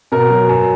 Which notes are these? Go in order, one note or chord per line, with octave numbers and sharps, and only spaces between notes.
B2 A#4
F#3
F#2